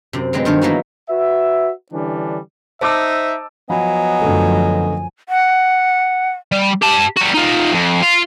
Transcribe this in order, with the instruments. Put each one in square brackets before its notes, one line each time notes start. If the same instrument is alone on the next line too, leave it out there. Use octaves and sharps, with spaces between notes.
[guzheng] F#2 C3
F#3 G#3 B3 C4
G2 D#3 C5 C#5
E3 F#3 A#3 B3 D#4 F#4
[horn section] F#4 B4 E5
D3 E3 G3 C#4 D4
[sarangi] D#4 [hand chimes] C5 [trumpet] E5 [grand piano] A5 D6 E6
[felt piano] F3 F#5 B5 [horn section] F#3 B3 D#5 [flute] G#5
[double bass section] F#2 F3 [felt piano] D3 A3 A4
[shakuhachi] F#5
[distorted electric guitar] G3
G4 A5
G3 F#4
D#4 F4
F2
F4